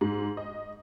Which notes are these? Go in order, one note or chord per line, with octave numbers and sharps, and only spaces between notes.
G#2
D#5